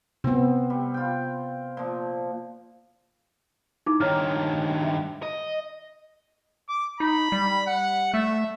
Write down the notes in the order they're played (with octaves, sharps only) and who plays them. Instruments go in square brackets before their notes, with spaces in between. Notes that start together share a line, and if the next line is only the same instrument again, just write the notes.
[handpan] C3 B3 [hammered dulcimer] C4
[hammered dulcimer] G3
F4 G5
A#2 F3
[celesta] D#4 E4 D6
[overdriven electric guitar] G2 D#3 [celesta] C#5 A#5 F6
[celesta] E5
[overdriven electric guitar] D#5
[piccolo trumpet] D6
[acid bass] D#4 [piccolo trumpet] B5
[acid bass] G3
[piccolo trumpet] F#5
[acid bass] A3 [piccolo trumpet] E5